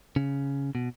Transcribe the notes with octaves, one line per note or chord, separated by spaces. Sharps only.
C#3
B2